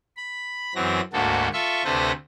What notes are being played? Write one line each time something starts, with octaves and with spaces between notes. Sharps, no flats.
B5
F#2 E3 F#3 C4 A#6
D2 G#2 A#3 F#4 A4
F4 A4 E5 C#6
D2 C3 A4 B4 C5 A#6